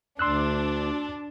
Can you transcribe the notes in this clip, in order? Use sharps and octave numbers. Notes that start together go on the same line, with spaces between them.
D2 D4 C6 E6 F#6